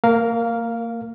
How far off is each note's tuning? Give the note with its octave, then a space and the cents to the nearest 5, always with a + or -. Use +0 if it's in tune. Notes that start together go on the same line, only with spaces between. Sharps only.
A#3 -30 A#4 +0 F5 +0